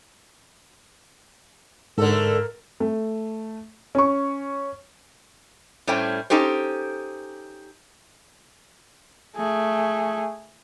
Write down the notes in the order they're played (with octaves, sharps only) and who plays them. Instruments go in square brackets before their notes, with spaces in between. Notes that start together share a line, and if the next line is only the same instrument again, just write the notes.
[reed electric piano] G#2 [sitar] D3 A3 A4 [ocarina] A#4
[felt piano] A3
C#4 C#6
[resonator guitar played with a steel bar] A2 G3 A3 C#4 C5 G5
C#4 D#4 G4 A4 C5
[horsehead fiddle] A3 G#4